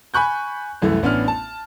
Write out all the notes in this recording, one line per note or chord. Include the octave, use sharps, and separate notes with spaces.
G#5 B5 C#6 F#6 G6
C2 F#2 E3 A3
A1 B3 C#4 D4 F6
A5